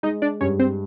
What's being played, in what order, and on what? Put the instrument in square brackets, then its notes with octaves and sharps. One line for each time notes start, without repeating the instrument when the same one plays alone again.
[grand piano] G#3 [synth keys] D#4 D#5
[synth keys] D4 D5
[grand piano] G2 [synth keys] C#4 C#5
[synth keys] C4 C5